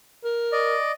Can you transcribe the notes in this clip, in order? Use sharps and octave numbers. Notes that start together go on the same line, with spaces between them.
A#4
D5 D#5